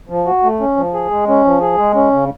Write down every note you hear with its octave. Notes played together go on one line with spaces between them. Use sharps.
F3
F#4
A3
C#4
F3
G#4
G#3
C#4
F3
G#4
G#3
C#4
C#3